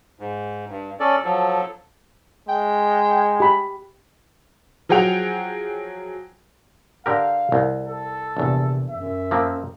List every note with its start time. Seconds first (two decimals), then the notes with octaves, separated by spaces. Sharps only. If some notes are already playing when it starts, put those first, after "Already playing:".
0.20 G#2
0.69 G2
1.00 C#4 A4 D5
1.24 F3 F#3 A4
2.49 G#3 G5
3.40 G4 B5
4.89 F3 F#3 G#4 F#5 G5 F7
7.06 D3 G4 A#4 F5
7.52 C2
7.85 A4
8.37 A#1 E2 C3
8.90 F#2 E5
9.31 F3 A#3 C4